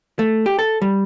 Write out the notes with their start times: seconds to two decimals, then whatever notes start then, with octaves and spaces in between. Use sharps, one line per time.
0.19 A3
0.46 G4
0.59 A4
0.82 G3